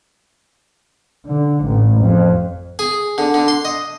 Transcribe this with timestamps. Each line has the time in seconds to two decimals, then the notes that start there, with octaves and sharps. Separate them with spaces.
1.26 D3
1.65 A1 A2
2.01 F2
2.79 G#4
3.18 D3
3.34 D3
3.48 C6
3.65 D#5